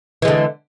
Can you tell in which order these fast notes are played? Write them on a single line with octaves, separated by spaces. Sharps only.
E3 G#3 D3